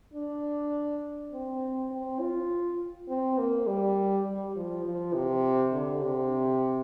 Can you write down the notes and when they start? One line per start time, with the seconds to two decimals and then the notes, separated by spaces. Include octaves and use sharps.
0.14 D4
1.32 C4
1.91 C4
2.21 F4
3.09 C4
3.38 A#3
3.67 G3
4.25 G3
4.56 F3
4.85 F3
5.14 C3
5.73 D3
6.02 C3